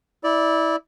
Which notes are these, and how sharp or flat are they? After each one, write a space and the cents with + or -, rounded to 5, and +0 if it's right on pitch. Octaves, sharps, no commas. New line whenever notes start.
E4 -20 D5 -5